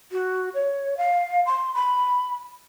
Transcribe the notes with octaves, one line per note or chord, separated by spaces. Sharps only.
F#4
C#5
F5
C6
B5